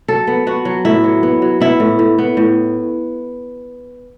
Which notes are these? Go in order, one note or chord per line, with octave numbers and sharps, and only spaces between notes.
F#3 A4
B3
B3 F#4
F#3
A2 E4
F#3
B3
F#3
B3 E4
A2
A2
B3
A2